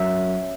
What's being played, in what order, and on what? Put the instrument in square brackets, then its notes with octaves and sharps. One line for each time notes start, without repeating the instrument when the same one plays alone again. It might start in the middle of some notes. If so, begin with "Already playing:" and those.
Already playing: [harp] F#2 F#3 E5